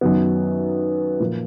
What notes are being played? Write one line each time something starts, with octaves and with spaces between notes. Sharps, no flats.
F#2 D#3 F#3 B3
A#2 F3 A#3